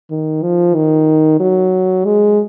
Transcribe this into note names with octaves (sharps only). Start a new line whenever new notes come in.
D#3
F3
D#3
F#3
G#3